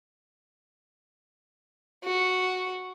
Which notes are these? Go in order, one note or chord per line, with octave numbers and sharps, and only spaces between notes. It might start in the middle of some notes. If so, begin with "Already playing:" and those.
F#4